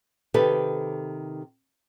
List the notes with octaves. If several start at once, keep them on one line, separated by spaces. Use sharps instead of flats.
C3 D#3 G4 A4 B4